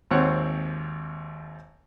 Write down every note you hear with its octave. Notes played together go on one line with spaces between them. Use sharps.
G#1 D#2 C4 C#5 F#5